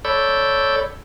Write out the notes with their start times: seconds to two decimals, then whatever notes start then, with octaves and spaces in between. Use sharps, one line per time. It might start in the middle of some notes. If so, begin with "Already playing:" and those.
0.05 A4 C#5 D5 B5 E6 G6